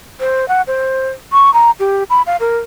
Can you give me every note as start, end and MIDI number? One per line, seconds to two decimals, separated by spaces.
0.20 0.48 72
0.48 0.62 78
0.67 1.10 72
1.32 1.53 85
1.54 1.71 82
1.80 2.03 67
2.10 2.22 83
2.26 2.36 77
2.40 2.57 70